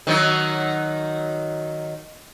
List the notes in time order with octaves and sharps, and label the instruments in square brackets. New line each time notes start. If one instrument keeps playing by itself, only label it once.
[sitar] D#3 F#3 D#4